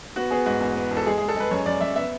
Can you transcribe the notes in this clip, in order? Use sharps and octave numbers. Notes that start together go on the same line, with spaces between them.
B3 F#4
B3 G#4
G#2 F#4
E2
B3
E2
A4
G#3 G#4
G#4
G#3
A4
G#3 B4
F#2 C#5
F#2 D5
F#2 E5
B3 E5